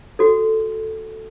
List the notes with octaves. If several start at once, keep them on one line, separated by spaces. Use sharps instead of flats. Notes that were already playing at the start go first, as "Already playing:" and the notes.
F#4 A4